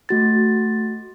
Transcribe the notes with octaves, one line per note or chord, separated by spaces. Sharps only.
A3 F#4 A6